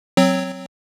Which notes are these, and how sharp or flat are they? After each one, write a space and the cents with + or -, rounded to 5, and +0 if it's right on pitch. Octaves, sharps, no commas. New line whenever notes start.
F#3 +0 C4 +0 C#5 +0